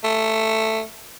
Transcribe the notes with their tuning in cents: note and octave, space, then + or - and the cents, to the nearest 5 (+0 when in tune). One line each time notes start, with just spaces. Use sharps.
A3 +10